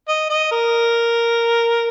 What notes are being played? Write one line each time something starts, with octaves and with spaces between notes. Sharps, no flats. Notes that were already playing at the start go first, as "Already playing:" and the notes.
D#5
D#5
A#4